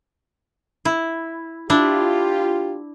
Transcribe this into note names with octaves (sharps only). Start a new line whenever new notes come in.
E4
D4 E4 F4 G4